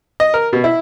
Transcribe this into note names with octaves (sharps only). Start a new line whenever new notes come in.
D#5
A#4
B2
E4